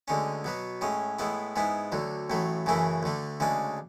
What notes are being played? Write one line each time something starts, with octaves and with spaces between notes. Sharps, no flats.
D2 D3 G#3 C#4
B2 F#3 B3
A2 G#3 C#4
A2 G#3 B3 E4
G#2 G#3 B3 E4
D2 D3 F#3
A1 A2 F#3 A3
F#2 C#3 E3 A3 E4
D2 D3 A3
D2 C#3 G#3 D4